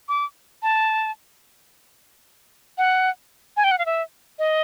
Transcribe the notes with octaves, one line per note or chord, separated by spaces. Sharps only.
D6
A5
F#5
G#5
G5
F#5
F5
E5
D#5